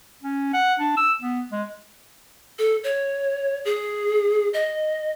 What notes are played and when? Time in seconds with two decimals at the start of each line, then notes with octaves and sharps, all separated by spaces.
0.22 C#4
0.53 F#5
0.79 D4
0.97 E6
1.22 B3
1.52 G#3
2.59 A4
2.84 C#5
3.65 G#4
4.54 D#5